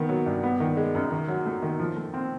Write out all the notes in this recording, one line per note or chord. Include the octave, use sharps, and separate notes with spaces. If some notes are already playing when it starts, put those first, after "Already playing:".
Already playing: D#3 B3
F#3
G2
B3
D#3
G#3
F#2
D#3
F#3
A3
D#3
F3
A3
C4